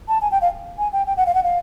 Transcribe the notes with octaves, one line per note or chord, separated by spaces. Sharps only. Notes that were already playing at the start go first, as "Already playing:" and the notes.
A5
G#5
G5
F5
G#5
G5
G5
F#5
F5
F#5
F5